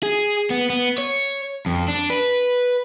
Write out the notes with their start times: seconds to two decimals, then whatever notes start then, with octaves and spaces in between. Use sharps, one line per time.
0.03 G#4
0.50 B3
0.70 B3
0.98 C#5
1.66 F2
1.88 D4
2.10 B4